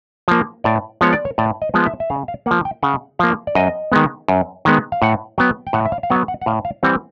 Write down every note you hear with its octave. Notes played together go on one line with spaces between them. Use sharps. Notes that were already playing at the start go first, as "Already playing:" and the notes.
F3 A#3
A2 D5
F3 G#3 B3 C#5
D5
C#5
A2 D5
D#5
F3 G#3 B3
E5
E5
C#3 F5
F5
F3 A#3 F#5
G5
C#3 F#5
F3 A#3 F5
D5
F#2 D#5
D#3 G#3 B3
F#2
D#3 G#3 B3
F5
A2 F#5
F#3 B3 G5
G5
A2 F#5
E5
F5
F5
F#3 B3 F#5
F#5
F#5
A2 F5
F5
E3 G3 C4 F#5